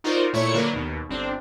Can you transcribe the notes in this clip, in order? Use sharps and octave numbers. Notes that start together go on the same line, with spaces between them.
D#4 F4 F#4 A#4 C5 D5
A#2 A3 E4 C#5 C#6 C#7
D3 F#3 A#3 D4 A#4 B4
D#2 B2
G1 C4 D4